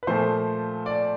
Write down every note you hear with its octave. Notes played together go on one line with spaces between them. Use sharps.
B4
A#2 F3 A3 C5
D5